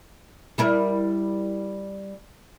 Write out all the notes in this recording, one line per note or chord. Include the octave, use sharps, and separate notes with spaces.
G3 E4 A#4